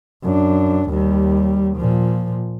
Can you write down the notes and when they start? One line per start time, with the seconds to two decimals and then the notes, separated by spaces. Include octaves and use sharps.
0.23 F#2 D4
0.90 D#2 G3
1.77 A#2 F3